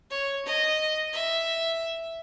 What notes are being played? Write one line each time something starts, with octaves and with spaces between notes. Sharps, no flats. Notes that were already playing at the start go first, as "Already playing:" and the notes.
C#5
D#5
E5